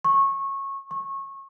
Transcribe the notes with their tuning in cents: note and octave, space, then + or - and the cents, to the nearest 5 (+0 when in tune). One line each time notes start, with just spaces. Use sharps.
C#6 -20
C#6 -25